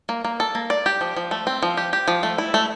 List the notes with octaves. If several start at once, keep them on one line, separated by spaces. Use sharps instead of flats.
A#3
A#3
A4
A#3
D5
G4
F3
F3
A3
C4
F3
G4
G4
F3
A3
E4
A3